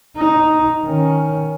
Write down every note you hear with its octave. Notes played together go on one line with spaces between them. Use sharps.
D#4
D#3 C#4